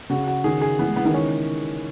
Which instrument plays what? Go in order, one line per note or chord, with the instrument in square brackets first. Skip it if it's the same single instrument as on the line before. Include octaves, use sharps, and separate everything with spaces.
[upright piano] C#3 [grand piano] F#4
[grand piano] F#4
[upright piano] D#3 [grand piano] G#4
[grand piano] G#4
[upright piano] E3 [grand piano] B3
[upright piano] G#3
[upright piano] E3 [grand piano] B3
[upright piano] D#3
[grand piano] C#4